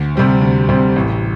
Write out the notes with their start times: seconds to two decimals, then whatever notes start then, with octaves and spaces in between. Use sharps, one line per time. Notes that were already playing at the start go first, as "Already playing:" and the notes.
Already playing: D2
0.15 C3 G3 C4
0.41 D2
0.69 C3 G3 C4
0.96 A1